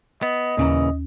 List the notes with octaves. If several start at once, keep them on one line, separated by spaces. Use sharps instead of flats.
B3 D#5
D#2 A#2 C#3 E3 C#4 A#5